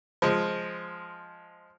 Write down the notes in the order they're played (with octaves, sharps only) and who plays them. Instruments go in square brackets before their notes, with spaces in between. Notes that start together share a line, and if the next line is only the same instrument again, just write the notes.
[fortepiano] F3 G#3